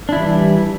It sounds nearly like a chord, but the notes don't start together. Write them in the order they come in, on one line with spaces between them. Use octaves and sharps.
D4 E4 E3 G3